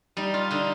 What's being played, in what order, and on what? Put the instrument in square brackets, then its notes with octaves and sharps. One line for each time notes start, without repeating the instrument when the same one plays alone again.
[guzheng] G3 D#4
F4
D3 D#4